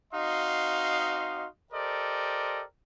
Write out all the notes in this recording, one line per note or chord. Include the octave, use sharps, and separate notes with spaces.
C4 D#4 F#4 D#5 F5 C6
G4 A4 A#4 C5 D5 D#5